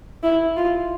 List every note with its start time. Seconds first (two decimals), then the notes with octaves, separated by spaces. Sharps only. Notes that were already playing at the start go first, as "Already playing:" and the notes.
0.23 E4
0.57 F4